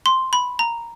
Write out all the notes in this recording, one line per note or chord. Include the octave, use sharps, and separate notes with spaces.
C6
B5
A#5